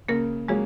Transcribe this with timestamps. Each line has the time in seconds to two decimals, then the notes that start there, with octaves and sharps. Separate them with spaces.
0.08 C#3 A#3 A#4
0.48 F#3 G#3 A#3 C#4 G#4